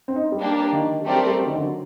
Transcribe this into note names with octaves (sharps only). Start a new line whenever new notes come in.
C4
D#4
G3
A#3 D4 G4
D#3
G3
F#3 A3 C4 G4 A#4 D5
G3
G3
F#3
D#3
D3
F#3